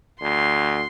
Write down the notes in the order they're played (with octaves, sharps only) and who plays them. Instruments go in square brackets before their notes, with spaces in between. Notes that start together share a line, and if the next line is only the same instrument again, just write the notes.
[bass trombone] D2 [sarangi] C6